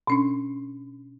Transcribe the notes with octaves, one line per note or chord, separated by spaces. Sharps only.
B2 C#4 D4